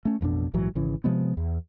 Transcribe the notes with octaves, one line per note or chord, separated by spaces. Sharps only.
A3 C#4
A1 F2 B2 D4
A#1 G#2 E3 F#3
G#1 C#3 E3
C3 F3 G#3 B3
E2